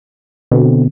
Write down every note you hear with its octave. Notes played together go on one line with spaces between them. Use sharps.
B2 D3 C4